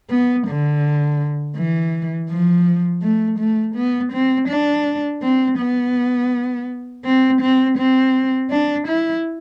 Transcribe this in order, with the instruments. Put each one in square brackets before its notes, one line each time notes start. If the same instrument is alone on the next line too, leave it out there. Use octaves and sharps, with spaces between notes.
[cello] B3
D3
E3
F3
A3
A3
B3
C4
D4
C4
B3
C4
C4
C4
D4
E4